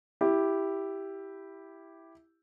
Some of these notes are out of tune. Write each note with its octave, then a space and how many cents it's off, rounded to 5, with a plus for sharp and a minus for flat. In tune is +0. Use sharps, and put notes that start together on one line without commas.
E4 +0 G4 +0